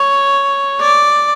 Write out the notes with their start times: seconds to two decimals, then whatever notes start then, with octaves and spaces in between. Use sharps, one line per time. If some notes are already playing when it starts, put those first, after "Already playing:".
Already playing: C#5
0.81 D5